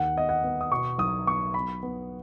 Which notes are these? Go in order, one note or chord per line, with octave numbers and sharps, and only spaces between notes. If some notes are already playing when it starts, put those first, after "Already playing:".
Already playing: D#2 F#5
B3 D#5
F#5
B3
D#6
B2 C#6
B1 D#6
B3 C#6
B3 B5
B3